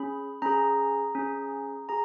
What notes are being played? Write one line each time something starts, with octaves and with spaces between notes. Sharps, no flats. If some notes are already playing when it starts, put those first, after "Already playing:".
Already playing: C#4 G#4 B5
C#4 G#4 A#5
C#4 G#4
G#4 A#5